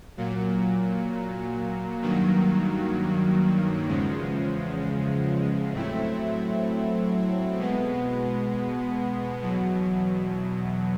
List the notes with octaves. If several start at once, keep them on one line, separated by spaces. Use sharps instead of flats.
A#2 F#3 A#3
G2 D#3 F#3 A#3
E2 C#3 F3 G#3
A2 F#3 A3 C4 E4
B2 G#3 B3
E2 B2 F#3